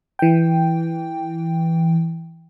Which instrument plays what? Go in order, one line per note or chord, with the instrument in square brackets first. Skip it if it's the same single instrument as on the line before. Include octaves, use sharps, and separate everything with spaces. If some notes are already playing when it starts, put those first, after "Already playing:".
[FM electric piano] E3 G5